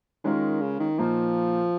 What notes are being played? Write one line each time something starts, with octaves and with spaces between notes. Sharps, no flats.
D#3 G#3 C#4 F4 A#4
C#3
D#3
A#2 F3 A#3 D#4